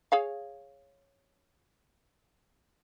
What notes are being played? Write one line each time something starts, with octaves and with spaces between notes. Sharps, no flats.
G#4 C#5 F5